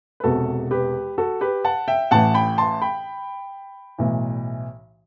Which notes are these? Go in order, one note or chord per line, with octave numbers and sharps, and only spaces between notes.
B4
E1 E2 C3 F#4 A4
G4 B4
F#4 A4
G4 B4
F#5 A5
E5 G5
A1 A2 E3 F#5 A5
G5 B5
A5 C6
G5 B5
B1 A2 E3